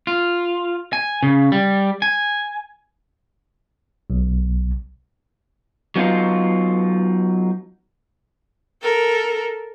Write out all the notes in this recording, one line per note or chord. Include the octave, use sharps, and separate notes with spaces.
F4
G#5
C#3
G3
G#5
B1
F#3 B3 D#4 F4
A4 A#4